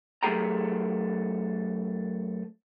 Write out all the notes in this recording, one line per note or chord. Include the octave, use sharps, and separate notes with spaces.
F#2 A3 G4 G#4 G5 A#5